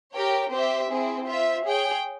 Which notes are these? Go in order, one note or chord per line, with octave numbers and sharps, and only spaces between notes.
G4 A#4 C#5 G5
C4 G4 C5 E5
C4 E4 G#4
F4 C5 E5
G#4 C#5 G5